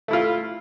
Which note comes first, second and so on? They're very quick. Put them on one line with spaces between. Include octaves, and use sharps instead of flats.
A3 E4 F4